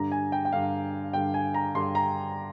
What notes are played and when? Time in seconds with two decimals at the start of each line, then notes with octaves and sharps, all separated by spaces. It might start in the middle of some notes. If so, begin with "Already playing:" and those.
Already playing: G2 D3 A#5
0.12 G#5
0.32 G5
0.45 G5
0.52 G2 D3 F5
1.13 G2 D3 G5
1.34 G#5
1.54 A#5
1.74 G2 D3 C6
1.95 A#5